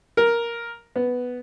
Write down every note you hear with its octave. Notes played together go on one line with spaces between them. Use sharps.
A#4
B3